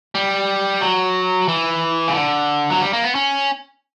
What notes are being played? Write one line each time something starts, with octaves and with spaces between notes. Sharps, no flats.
G3
F#3
E3
C#3
D3
F#3
G3
A#3
B3
C#4